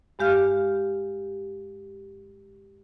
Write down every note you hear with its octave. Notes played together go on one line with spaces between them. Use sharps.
G2 G#3 G4 F5 F6